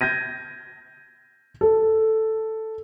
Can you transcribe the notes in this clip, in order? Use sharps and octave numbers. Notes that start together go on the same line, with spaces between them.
G6 G#6 A#6 D#7
A4